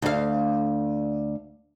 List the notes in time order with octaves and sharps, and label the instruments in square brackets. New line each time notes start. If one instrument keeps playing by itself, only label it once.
[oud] D2 F5